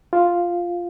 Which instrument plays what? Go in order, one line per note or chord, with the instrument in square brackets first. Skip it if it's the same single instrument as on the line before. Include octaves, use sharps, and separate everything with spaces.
[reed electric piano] F4